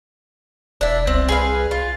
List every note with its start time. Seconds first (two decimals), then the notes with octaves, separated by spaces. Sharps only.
0.81 E1 D4 E4
1.07 C2 C4
1.29 G#4 B4 F5
1.71 F4